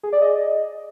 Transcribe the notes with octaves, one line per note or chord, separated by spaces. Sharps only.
G#4
D5
D#5